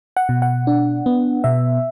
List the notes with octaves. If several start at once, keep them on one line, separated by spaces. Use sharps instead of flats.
F#5
B2
F#5
D4
B3
B2 E5